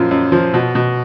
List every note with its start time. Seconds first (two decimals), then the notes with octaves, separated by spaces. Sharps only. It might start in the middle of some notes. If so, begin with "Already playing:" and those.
Already playing: F#2 A#2 F3 F4
0.11 F#2
0.32 F3
0.54 B2
0.75 B2